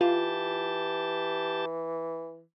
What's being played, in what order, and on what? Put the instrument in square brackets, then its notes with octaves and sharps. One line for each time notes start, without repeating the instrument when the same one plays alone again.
[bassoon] E3 [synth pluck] F4 [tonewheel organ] G4 A5